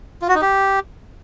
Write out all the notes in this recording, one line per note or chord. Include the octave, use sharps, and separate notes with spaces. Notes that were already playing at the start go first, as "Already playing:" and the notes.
F4
F#4
D#4
G4